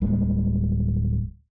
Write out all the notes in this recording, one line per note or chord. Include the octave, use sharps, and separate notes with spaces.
D1 G3 G#3 A#3